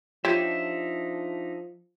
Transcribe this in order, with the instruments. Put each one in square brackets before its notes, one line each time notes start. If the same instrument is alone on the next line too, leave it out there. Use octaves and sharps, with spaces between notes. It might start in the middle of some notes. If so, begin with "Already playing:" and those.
[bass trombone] F3 [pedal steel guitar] D4 D#4 E5 [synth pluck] F4 [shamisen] G4 C#5